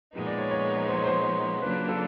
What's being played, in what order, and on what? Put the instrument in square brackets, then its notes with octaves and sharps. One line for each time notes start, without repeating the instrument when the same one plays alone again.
[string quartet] A#2 F3 G#3 B3 D#4
[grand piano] D5
C#5
C#5
C5
C#5
C5
[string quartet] C#3 F#3 A#3 D4 F4 [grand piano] B4
[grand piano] A4